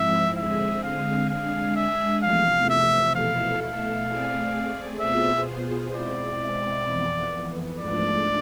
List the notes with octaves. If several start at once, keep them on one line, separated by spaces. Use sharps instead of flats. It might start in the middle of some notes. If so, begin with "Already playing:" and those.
Already playing: G#2 F3 G#3 C4 E4 E5
D3 G#3 C4 G#4 E5
F5
G#3 D4 G#4 F5
E5
E2 C3 F3 A3 F5
E5
B2 A3 E4 A4 F5
F5
A3 C4 G#4 D5
B2 B3 F4 G#4 C5 E5
B2 G#3 C4 E4 D5
F2 E3 B3
G#2 F3 A3 D4 D5